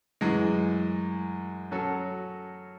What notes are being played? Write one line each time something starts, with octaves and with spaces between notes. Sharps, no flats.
F#2 E3 G#3
F#3 C#4 F#4 A4